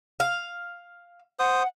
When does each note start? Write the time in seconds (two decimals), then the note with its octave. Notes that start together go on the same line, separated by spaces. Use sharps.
0.20 F5
1.39 C5 F#5 D#6